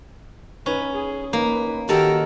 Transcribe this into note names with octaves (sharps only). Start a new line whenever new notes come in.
C#4 D#4 B4
G#4
A#3 D#4 B4
D#3 F#4 G4 A4 A#4